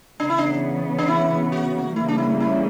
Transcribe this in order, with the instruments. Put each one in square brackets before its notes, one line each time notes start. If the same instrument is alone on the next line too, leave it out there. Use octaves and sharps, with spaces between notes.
[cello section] C#3 E3 B3 [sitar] D4
[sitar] E4
D4
D4
E4
F#4
[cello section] C#3 E3 G3 A#3 [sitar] E4
[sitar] D4
E4
E4